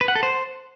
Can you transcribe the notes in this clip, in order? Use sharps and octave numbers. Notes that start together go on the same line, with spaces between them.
B4
F#5
A4
C5